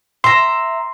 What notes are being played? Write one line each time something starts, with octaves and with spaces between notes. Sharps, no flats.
E5 A#5 C6